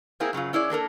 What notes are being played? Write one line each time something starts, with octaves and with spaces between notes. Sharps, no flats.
A#3 C4 E4 G#4 A#4
F#2 C#3 F#3 F4
C#4 E4 G#4 D5
A#3 D4 A4 A#4